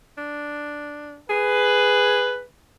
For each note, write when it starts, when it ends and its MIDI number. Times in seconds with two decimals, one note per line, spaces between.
0.18 1.19 62
1.30 2.41 68
1.30 2.43 71